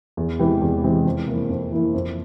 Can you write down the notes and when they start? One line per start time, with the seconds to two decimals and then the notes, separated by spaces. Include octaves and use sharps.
0.17 E2
0.39 E3 G#3 C4 G4
0.62 E2
0.83 E3 G#3 C4 G4
1.05 F2
1.28 E3 A#3 E4
1.50 F2
1.72 E3 A#3 E4
1.94 F2